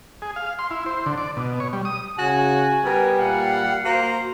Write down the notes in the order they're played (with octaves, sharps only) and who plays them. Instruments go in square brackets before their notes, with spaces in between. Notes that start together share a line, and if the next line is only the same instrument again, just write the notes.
[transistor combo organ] G#4
F5
C6
E4
C5
D3
D5
B2
C#5
G3
D#6
[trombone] C#3 [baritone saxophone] F#4 [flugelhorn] G#5
[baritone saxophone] G3 [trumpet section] B3 A#4 [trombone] B4
[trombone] A#2 [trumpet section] F5 F#5
[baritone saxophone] A#3 [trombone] F#4 [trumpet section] C5 A#5